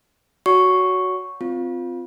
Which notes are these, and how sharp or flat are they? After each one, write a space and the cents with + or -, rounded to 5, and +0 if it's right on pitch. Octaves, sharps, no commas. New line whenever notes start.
F#4 +0 C#5 +30 C#6 +0
C4 -20 F4 +5